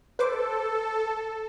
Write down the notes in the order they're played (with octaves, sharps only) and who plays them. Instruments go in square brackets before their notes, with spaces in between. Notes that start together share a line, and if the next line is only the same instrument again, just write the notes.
[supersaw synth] A4 [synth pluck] B4 C5 D6